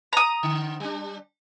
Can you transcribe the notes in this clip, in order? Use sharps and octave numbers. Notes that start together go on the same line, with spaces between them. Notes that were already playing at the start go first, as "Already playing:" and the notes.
A#5 D#6
D3
G3 D4